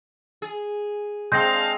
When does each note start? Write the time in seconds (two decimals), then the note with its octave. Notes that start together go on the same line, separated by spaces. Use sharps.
0.42 G#4
1.32 G#3 C4 D4 C5 F5 G6 A#6